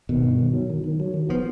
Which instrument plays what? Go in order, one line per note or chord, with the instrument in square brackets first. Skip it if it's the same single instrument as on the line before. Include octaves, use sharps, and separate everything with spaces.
[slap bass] B2 [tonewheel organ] D#3
[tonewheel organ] G2
D#3
F#3
D#3
D#3
F#3
D#3
[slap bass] F3 [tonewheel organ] B3